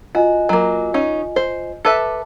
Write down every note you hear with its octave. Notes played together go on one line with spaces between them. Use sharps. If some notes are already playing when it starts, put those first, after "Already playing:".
F4 F#4 D#5 G#5
F#3 A#3
C#4 D#4
C5
A4 B4 E5 A5 D6